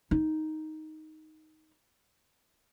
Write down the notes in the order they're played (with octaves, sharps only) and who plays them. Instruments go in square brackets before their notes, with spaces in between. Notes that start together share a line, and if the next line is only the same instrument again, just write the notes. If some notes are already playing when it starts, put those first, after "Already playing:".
[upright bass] D#4